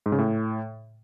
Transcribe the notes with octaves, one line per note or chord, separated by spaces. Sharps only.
G#2
C#3
A2